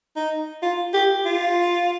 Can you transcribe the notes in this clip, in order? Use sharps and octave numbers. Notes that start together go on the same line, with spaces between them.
D#4
F4
G4
F4